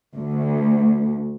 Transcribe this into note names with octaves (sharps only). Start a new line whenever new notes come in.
D2